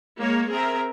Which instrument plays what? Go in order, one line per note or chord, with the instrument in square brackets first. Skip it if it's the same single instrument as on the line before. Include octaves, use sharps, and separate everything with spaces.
[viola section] G#3 A#3 C#5
C4 G#4 A#4 E5